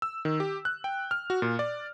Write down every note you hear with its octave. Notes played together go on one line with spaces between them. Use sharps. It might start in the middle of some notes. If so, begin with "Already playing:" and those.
E6
D#3
G4
F#6
G5
F6
F#4
A#2
D5